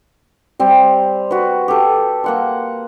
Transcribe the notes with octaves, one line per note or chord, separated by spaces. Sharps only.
G3 C4
F#4 B4
G4 A4
A#3 F#5 C6